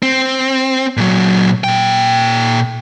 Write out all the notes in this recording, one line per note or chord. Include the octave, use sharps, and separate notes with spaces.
C4
A#2 F#3
A#2 G5